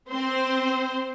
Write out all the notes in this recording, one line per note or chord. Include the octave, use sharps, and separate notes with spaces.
C4 C5